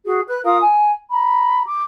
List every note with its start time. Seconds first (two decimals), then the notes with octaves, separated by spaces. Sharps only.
0.06 F#4 G#4
0.28 B4 F#6
0.44 F4 A#4 F5 D#6
0.61 G#5
1.10 A#5 B5
1.66 D6